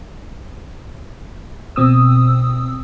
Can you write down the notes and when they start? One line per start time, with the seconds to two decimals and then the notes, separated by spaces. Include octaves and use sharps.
1.76 B2 C4 D#6 E6